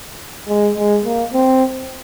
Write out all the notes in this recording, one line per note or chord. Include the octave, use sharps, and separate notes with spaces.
G#3
G#3
A#3
C4